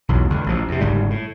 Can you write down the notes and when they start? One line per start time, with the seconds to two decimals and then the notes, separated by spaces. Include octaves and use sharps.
0.09 B1 E2 F#3
0.30 C#2 D3
0.46 A1 F3
0.68 E2 C3
0.81 G1 G#2 C#3 G3
1.10 A2